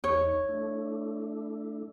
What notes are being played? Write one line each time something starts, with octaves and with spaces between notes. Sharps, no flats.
E2 D#4 C#5
A3 D4 E4